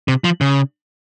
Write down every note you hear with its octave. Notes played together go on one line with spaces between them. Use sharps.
C3
F3
C#3